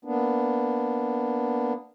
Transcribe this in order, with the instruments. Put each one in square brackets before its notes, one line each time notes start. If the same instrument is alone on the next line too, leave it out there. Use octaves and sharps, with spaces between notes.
[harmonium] A#3 B3 D4